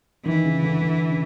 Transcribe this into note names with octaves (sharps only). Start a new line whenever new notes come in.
D#3 E3
C#3
D3
D3
C#3